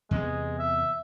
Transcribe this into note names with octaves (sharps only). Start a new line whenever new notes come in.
E2 C3 G#3 B3
E5